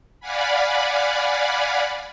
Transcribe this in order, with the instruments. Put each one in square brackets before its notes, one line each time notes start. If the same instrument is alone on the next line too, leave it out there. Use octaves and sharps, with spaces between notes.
[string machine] D5 F5 F#5 G#5 B5